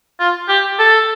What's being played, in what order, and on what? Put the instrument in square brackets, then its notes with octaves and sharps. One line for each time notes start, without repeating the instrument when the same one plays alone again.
[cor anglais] F4
G4
A4